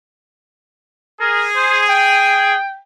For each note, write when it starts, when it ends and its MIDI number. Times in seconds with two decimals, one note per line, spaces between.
1.21 2.55 68
1.21 1.45 70
1.56 1.81 72
1.89 2.78 79